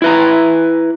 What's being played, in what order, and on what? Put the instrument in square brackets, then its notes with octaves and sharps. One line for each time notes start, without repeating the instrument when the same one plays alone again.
[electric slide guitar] E4 B4 A#5